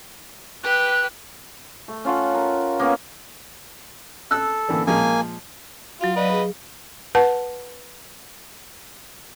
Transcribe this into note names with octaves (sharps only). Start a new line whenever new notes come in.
G4 B4 F#6
A3
C#4 F4 A4 F#5
A#4
A#3 B3 C#4
A4 E6 F#6
D3 E3 A#3
A#2 F3 G#3 A#3 G#5
F#3 F4 F#4 F5
B4 D5 D#5
G#4
B4 F#5 A5